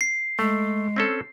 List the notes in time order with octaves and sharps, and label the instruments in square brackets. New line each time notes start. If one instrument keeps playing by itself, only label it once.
[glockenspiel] C7
[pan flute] G#3 [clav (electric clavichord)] A3
[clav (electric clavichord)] C4 C#4 A4